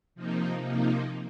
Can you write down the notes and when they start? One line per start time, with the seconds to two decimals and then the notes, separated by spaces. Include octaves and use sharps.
0.15 C3 F3 A#3 D#4
0.60 C3 F3 A#3 D#4